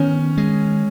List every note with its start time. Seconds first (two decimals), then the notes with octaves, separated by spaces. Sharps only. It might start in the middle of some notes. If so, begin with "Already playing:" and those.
Already playing: D#3 B3 C#4
0.37 G#3